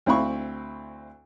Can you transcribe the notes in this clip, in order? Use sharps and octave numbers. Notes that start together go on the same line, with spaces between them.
D2 C4 E4 F5 B5 C#6